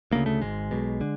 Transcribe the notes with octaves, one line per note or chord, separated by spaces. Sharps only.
D2 C#3 A#3
A3
G#1 G#2 G#3
B1 B2
D3